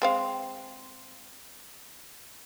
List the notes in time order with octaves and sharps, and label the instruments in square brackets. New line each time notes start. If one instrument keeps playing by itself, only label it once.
[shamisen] G#3 C4 F5